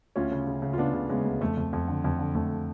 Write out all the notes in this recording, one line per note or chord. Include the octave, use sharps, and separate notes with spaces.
D2 C#4 F4
C#3
C#3
C#3
F4
C#3 B3 D4
C#3
C#3 G#3 B3
D2
F2 A3
F2
F2
D3
F2
D3
F2 A3